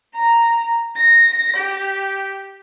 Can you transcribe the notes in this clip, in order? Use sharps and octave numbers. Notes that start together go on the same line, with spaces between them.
A#5
A#6
G4